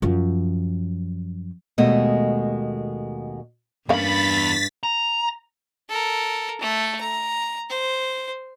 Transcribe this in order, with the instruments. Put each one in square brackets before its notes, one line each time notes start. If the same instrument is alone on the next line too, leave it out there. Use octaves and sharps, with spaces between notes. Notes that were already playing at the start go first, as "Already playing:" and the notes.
[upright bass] F#2 F3
[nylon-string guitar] D#2 B2 G#3 A3 D#5
[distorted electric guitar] E2 B5 [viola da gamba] G2 [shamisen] A#3 C#4 F5 [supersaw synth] A6 B6
[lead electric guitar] A#5
[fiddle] A4 A#4
A3 A4
A#5
C5